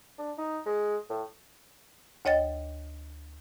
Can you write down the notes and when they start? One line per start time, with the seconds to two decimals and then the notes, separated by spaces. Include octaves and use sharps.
0.18 D4
0.38 D#4
0.66 G#3
1.10 A2
2.25 D2 C#5 D#5 G5 A6